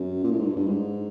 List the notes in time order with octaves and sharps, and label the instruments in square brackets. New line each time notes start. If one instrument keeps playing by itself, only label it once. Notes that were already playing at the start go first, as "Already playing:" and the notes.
Already playing: [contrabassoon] F#2
A#2
A2
G#2
G2
G2
G#2